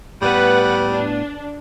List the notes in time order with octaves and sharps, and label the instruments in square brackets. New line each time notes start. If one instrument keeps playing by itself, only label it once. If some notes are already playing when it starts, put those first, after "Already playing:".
[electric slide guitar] A2 B3 [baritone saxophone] G3 [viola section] B4 F#5
[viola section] D4